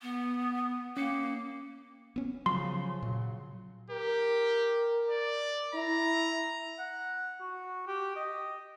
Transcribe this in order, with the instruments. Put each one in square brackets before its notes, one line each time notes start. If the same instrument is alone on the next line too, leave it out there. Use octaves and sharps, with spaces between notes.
[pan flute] B3
[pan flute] A#3 [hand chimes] C#4 C#7
[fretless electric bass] B3 C#4
[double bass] C#3 F3 [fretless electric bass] F#3 [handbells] C6
[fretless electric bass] A#2 [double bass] C#3 F#3
[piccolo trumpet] G4 [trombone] A#4
[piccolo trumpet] D5
[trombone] E4 [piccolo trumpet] A#5
[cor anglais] F#5
F#4
G4
D#5